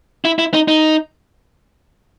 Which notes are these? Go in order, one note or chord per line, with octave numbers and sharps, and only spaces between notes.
E4
E4
D#4
D#4